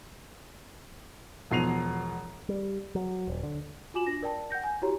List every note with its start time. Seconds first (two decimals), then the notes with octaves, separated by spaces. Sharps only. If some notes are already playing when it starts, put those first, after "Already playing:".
1.51 E1 B2 F3 C7 D#7 F7
2.49 G3
2.95 F#3
3.28 D#1
3.43 D3
3.94 F4 F#4 G#5 D6 E7 F#7
4.07 D4 A#6
4.22 A#4 D5 G5 A5
4.50 F#5 G5 G6 A#6
4.64 G#5
4.82 E4 F#4 G4 C#5 A#5